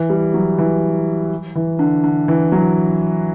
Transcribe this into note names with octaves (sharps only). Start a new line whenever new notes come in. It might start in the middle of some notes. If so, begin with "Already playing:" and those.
Already playing: E3
G3
F#3
E3
E3
D3
D3
E3
F#3